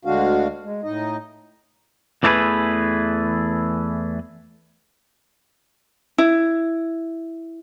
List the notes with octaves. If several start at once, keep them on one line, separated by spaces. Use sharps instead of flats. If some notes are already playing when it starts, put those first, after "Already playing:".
D2 D3 G#3 D4 F#4 F5
G#3
A2 D#4 D#5
E2 E3 A3 D4 G#4 B4
E4